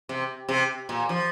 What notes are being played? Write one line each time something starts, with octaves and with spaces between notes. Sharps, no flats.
C3
C3
A#2
F3